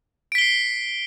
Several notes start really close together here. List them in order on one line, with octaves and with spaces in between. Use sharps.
D7 B6 G7 C7